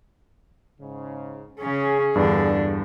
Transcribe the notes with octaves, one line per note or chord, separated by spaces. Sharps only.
G#2 C#3
C#3 C#4 G#4
E2 G2 D3 D4